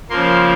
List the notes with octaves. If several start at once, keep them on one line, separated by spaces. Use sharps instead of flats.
C#3 F3 A#3 C6